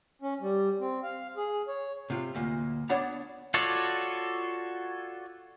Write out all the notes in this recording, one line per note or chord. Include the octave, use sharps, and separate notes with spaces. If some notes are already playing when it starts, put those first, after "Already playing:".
C#4
G3
C4
F5
G#4
C#5
C3 F4
D2 A#2
B3 D4 C#5 D5 F#5 B5
F4 F#4 A4 C#5 D5